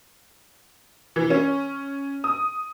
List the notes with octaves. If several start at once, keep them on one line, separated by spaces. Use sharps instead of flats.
E3
C#4
D#6